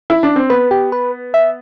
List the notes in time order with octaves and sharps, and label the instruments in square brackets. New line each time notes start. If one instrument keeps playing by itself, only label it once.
[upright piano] E4
D4
C4
[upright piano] B3 [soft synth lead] B4
[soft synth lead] G4
B4
E5